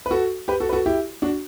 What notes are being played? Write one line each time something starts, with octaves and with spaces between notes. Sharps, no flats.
B4
F#4 A4
G4 B4
F#4 A4
B4
F#4 A4
E4 G4
D4 F#4